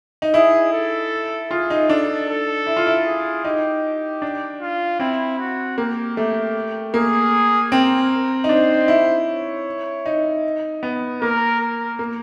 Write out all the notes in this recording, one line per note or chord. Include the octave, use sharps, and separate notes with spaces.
D#4
E4 G#4
A4
F4 G#4
D#4
D4 A4
A4
E4
F4
E4
G#4
D#4 G4
D4
F4
C4 E4
F#4
A#3 G4
A3 G4
A#3 G#4
C4 A#4
D#4
D4 C5
E4
C#5
D#4
B3
A#3 A#4
A#4
A#3